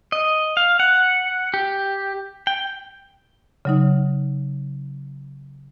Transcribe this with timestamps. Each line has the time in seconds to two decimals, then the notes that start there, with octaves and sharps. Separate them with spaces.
0.12 D#5
0.57 F5
0.80 F#5
1.54 G4
2.47 G5
3.65 C#3 F#3 D#4